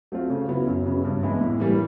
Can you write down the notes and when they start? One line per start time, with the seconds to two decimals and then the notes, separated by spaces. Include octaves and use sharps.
0.12 F#3 A3 C4 F4
0.30 C#3
0.49 F#3 B3 E4
0.67 F#2
0.85 C#3 F#3 B3
1.05 G2
1.23 E3 G#3 B3 E4
1.41 A2
1.60 E3 G3 A#3